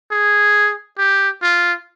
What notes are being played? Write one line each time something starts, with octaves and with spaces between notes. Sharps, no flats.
G#4
G4
F4